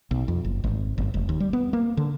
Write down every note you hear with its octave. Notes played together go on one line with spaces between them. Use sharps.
B1
F2
F#1
G#1
G1
F1
D#2
G3
B3
A#3
D3